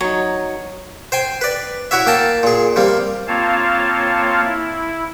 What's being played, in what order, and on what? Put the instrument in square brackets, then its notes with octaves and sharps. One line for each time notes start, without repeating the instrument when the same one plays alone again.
[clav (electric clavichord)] F#3 D#4 [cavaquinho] C#5
[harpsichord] C5 G5 G#5
B4 D5
E4 F#4 C#5 E5
A#3 G5 A5 A#5
A#2 G#4
C3 G3 A#3
[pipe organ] A#3 C4 F4 C#5 F5 A5
E4